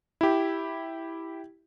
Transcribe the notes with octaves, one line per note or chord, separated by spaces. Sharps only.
E4 G4